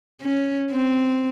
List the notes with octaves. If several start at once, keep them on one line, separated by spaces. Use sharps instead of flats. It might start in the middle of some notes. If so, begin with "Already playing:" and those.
C#4
C4